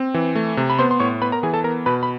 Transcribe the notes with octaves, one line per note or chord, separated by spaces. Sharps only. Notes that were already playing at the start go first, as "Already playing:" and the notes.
Already playing: C4
E3
A3
C3
B5
B3 C5 C6
C6
A2 C#5 C#6
B3 B4 B5
A#4 A#5
E3 G#4 G#5
A4 A5
B3 A#4 A#5
B2 B4 B5
B5